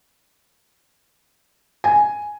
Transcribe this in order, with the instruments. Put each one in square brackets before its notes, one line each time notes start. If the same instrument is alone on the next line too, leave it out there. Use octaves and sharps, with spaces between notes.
[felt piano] G#5